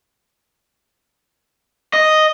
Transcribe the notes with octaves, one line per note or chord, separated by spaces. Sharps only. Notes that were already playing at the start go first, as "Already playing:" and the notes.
D#5